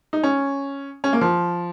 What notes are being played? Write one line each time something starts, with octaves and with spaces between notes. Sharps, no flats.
D#4
C#4
C#4
A#3
F3